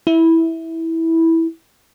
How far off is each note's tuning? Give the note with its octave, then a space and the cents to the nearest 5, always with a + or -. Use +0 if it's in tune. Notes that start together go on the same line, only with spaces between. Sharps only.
E4 -10